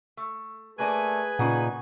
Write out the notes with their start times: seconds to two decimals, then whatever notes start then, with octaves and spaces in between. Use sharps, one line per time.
0.17 A3
0.79 A3 A#3 G#4 A#4 B4 D5 G#5
1.39 A#2 C#3 D#4 F#5